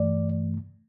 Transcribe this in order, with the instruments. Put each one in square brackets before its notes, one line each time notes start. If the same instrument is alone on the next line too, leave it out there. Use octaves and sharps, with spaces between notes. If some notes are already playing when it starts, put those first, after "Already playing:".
Already playing: [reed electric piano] G2 E3 A3 D5